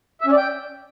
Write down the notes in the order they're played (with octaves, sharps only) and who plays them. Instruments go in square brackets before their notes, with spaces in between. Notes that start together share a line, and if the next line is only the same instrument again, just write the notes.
[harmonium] E5
C#4
D5
G5